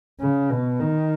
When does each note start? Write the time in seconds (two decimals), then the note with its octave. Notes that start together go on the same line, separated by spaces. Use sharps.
0.20 C#3
0.50 B2
0.80 D#3